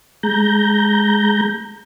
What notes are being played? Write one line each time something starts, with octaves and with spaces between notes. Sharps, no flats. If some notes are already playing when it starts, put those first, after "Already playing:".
G#3 A#5 G6